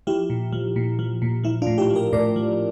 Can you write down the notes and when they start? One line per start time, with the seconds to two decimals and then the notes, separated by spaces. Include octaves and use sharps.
0.07 F3 E4 G4
0.30 A#2
0.53 F3
0.76 A#2
0.99 F3
1.22 A#2
1.44 F3 E4
1.62 D4 F4
1.67 A2
1.78 E4 G4
1.90 F3
1.95 G4 A#4
2.13 A2 A#4 D5
2.36 F3